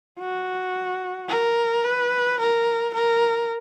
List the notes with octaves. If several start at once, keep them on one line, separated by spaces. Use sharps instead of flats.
F#4
A#4
B4
A#4
A#4